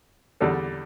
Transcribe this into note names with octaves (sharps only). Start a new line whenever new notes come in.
E2 D3 G3 D4 A4